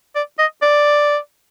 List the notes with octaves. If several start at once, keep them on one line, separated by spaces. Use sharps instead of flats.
D5
D#5
D5